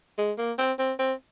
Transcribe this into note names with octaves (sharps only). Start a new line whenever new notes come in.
G#3
A#3
C4
C4
C4